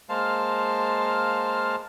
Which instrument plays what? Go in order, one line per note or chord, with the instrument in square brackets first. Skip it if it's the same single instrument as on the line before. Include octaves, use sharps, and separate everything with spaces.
[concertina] G#3 A#3 C5 F5 A5 F6